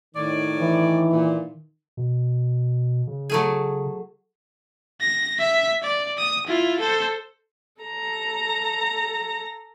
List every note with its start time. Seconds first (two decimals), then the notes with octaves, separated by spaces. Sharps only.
0.15 A2 D#3 C#5 D5
0.60 E3
1.12 A#2
1.97 B2
3.07 C#3
3.30 F#3 A3 G#4
5.01 A#6
5.39 E5 B6
5.83 D5
6.18 D#6
6.47 E4 F4
6.80 A4 C5
7.81 A4 A#5